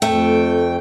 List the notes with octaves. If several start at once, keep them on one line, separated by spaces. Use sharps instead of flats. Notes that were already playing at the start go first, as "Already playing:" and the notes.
F2 A3 G5